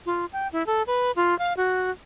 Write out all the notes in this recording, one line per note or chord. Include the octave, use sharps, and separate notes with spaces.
F4
G5
E4
A4
B4
F4
F5
F#4